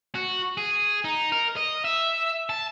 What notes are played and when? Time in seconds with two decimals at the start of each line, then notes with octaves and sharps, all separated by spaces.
0.15 F#4
0.57 G#4
1.05 D#4
1.32 A#4
1.56 D#5
1.85 E5
2.50 A5